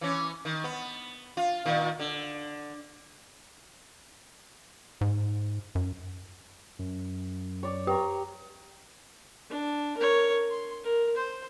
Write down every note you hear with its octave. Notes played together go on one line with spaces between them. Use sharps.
E3 C#4
D#3
B3
F4
A#2 D#3
D3
G#2
F#2
F#2
C#5 D5
G4 G5 A#5 C#6
D4
A#4 C#5
C6
A#4
C5